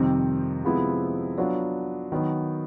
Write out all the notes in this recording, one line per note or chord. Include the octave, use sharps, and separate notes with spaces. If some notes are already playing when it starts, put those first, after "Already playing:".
Already playing: F2 C3 D#3 G3 C4
C3 F3 G#3 B3 E4
F#3 B3 D4 F4
D#3 F#3 B3 D#4